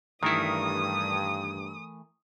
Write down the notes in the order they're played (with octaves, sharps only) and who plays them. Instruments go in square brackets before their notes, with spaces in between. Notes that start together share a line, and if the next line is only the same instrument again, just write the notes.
[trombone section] G2 [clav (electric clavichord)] D#3 E4 [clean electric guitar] E3 A3 A#4 [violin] D#6